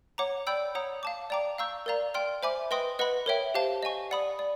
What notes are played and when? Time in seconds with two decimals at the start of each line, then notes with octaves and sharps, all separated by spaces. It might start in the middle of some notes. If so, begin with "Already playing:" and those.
0.18 C#5 F#5 A#5 D6
0.47 D5 G5 B5 E6 G6
0.75 C#5 F#5 A#5 D#6
1.03 F5 A5 D6
1.30 D5 G5 A#5 D6
1.58 F5 A#5 C#6 E6 G6
1.86 A#4 D5 F5 A#5
2.14 D5 G5 C6 F6
2.43 C5 E5 G#5 B5 D6
2.71 B4 D#5 G5 C6 D#6
2.99 B4 D#5 F#5 B5
3.26 A#4 C#5 E5 G5
3.55 G4 C5 F5 A5
3.83 D#5 G#5 C#6
4.11 D5 F#5 B5 D#6
4.39 D5